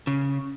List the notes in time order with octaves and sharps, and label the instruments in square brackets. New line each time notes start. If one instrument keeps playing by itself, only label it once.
[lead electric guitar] C#3